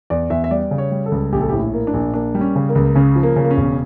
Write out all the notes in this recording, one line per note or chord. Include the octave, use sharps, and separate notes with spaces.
E2 D5
E2 E5
E5
G3 D5
C#3
C#5
G3
A4
C#2
A#1 G4
A4
A2 G4
E4
A#3
D4
A#1
A#3 D4
G3
C#4
C#3
A#3
C#2
C#3 C#4
F3
A#3
C#3
A#3
C#4
E1